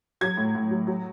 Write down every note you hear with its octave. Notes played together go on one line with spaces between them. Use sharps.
F#3 G#6
A2
A2
F#3
F#3